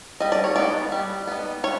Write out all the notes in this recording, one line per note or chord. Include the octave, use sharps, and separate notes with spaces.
G3 D#5
D5
C#5
B3 D#4 D5
G3
B3 D#4
G3 C#5